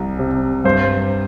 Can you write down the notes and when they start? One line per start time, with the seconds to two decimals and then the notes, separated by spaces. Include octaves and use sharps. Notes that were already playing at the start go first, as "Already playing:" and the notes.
Already playing: C2
0.19 C3
0.64 G2 C5